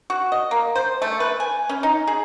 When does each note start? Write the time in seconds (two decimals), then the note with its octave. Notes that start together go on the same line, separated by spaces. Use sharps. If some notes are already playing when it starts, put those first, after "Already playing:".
0.10 F#4
0.32 D#5
0.51 A#3
0.75 C5
1.02 A3
1.20 B4
1.40 G#5
1.69 C#4
1.83 D#4
2.07 G#4